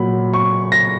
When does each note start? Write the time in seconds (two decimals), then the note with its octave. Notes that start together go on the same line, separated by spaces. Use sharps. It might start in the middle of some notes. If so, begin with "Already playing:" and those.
Already playing: A#2 F#3 B5
0.33 C#6
0.72 A#6